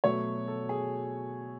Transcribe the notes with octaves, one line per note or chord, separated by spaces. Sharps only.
B2 F#3 A3 C#5
A4
G#4